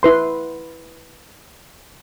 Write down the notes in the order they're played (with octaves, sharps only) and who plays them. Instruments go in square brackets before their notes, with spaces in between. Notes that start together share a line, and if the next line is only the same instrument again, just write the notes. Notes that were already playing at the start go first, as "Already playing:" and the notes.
[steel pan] E4 B4 C6